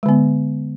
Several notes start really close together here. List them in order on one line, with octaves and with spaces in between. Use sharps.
G#3 D3 B3